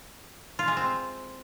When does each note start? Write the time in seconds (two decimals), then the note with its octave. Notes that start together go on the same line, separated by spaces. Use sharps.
0.59 F4
0.68 G#3
0.77 C4